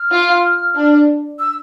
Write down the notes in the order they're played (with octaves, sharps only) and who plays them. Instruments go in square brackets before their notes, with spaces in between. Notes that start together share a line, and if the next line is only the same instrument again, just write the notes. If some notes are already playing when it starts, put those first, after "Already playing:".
Already playing: [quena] F6
[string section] F4
D4
[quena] E6